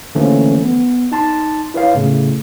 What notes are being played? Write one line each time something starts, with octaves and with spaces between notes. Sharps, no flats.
D3 E3 F3 A3 A#3 C#4
B3
D#4 A5 C6
E4 B4 C#5 F5
A2 C#3 A3